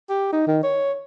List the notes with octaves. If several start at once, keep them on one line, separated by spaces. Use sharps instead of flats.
G4
D#4
D#3
C#5